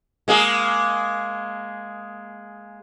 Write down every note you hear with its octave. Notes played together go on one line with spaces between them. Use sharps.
G#3 A#3 G#4